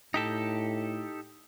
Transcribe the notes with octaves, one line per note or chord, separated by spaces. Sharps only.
A2 D#4 G4 A4